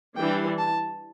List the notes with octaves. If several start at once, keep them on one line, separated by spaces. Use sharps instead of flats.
E3 G3 D4 G5
A5